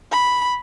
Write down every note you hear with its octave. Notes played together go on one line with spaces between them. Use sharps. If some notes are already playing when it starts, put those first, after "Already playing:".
B5